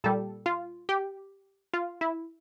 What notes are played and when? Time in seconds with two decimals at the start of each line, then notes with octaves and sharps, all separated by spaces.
0.04 A#2 G3 A4
0.46 F4
0.89 G4
1.74 F4
2.01 E4